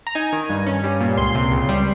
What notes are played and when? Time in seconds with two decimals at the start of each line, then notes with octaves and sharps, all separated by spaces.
0.07 A#5
0.15 D#4 G#5
0.33 D#3
0.50 G2
0.67 C#4
0.84 G3
1.01 A#2
1.17 C#2 C6
1.35 C3
1.51 C#2
1.69 G3